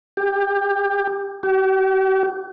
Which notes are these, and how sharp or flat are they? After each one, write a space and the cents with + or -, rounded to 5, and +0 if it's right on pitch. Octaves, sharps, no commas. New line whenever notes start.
G4 +20
G4 -45